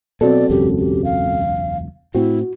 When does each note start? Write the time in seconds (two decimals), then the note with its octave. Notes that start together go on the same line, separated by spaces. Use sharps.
0.21 B2 F#3 C4 F#4 A4 D5
0.50 E1 C#2 F#2 G4
0.78 G4
1.04 F5
2.15 A2 C4 E4 F#4